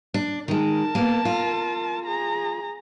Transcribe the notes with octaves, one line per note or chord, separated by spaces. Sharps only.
D4
D#3 G#3 A#4 A5
A#3 B3
F4
G#4 A#5